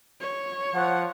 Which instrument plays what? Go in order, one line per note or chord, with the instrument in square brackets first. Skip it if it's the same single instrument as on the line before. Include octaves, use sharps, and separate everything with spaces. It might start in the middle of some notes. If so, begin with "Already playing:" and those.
[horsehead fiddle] C#5
[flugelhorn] F3 [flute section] F#5 F#6